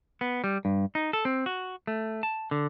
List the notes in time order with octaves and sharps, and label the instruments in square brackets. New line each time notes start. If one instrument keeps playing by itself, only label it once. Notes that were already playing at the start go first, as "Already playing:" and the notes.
[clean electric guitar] B3
G3
G2
D#4
A4
C4
F#4
A3
A5
D3